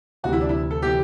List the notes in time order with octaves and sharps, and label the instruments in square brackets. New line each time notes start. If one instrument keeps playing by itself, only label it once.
[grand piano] D2 C3 E3 G3 [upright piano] F#4
[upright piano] E4
D4
E4
A4
[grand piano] C3 E3 G3 [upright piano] G4